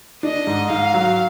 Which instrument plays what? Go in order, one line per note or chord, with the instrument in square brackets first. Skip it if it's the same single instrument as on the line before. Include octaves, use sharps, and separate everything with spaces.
[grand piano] D4 [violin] D#5
[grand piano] G#2
[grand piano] G#2 [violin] F5
[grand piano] F#3